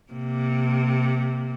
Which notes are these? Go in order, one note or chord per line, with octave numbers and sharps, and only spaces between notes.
C3 A#3